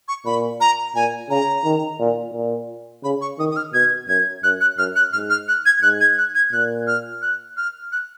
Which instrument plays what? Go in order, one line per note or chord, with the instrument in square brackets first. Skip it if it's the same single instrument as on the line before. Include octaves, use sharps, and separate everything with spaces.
[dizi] C#6
[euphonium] A#2 [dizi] B5
[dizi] A#5
[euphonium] A#2 [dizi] G#5
[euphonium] C#3 [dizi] A#5
[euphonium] D#3
A#2
A#2
[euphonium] C#3 [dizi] B5
[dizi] C#6
[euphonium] D#3 [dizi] D#6
[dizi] D#6
F6
[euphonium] B2 [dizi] G#6
[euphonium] F#2 [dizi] G#6
[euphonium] F#2 [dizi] F#6
[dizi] F#6
[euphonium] F#2 [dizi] F6
[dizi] F#6
[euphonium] G#2 [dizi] F6
[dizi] F6
F#6
G#6
[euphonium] G#2 [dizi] F#6
[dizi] G#6
F#6
G#6
[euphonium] A#2 [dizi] F#6
[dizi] F6
F#6
F6
F#6